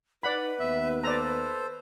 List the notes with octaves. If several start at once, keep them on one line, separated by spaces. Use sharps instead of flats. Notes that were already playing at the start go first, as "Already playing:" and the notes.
D#4 B4 D5 F#5 B5
D#2 B3 E5
A4 C5 D5 A#5